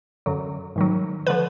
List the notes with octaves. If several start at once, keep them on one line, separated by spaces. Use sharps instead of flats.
F#2 D3 F#3
G#2 D#3 F#3
D3 F3 B4